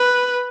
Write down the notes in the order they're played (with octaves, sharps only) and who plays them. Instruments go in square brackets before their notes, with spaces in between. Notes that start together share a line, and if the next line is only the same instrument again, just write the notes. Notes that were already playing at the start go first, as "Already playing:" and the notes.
Already playing: [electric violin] B4